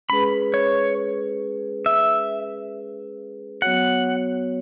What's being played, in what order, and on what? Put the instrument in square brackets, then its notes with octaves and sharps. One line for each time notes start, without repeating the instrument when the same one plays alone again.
[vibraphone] G#3 C#4 G#4 B4 [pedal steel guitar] B5
[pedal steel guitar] C#5
E5
[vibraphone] F#3 B3 F#4 C#5 [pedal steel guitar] F#5